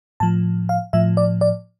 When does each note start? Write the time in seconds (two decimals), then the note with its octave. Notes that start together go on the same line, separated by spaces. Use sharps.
0.20 A2 F3 A5
0.69 F5
0.93 A2 F3 E5
1.17 D5
1.41 D5